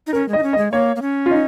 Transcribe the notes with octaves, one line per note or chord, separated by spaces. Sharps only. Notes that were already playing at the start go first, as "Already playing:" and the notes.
D#4
C#4 A#4
G#3 D#5
D#4
C#4
D#5
G#3
A#3 C#5
A#3
C#4
F4
D#4